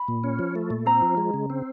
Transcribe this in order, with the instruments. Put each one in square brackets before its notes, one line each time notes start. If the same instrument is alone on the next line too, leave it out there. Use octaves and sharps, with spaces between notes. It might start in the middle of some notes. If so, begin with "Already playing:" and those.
Already playing: [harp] B5
[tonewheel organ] A#2
C#4
F3
A3
A#2
[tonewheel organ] C4 [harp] A#5
[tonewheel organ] F3
G#3
C#3
C4